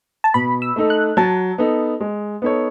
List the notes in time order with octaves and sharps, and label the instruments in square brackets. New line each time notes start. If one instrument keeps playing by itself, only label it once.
[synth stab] A5
[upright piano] B2 [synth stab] B5
[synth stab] E6
[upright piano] A3 D#4 A4
[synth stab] F#6
[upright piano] F#3 [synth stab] A5
[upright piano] B3 D#4 A4
G#3
B3 D#4 A4 C#5